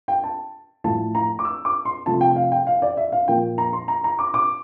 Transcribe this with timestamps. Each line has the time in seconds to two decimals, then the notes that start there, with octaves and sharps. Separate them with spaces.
0.08 G5
0.24 A5
0.84 A2 F3 A3 A5
1.15 A#5
1.39 D6
1.45 E6
1.65 D6
1.85 C6
2.06 C3 F3 A3 A5
2.21 G5
2.36 F5
2.52 G5
2.67 F5
2.82 D5
2.97 E5
3.12 F5
3.28 A#2 F3 A#3 G5
3.58 A#5
3.73 C6
3.88 A#5
4.04 A#5
4.19 D6
4.34 D6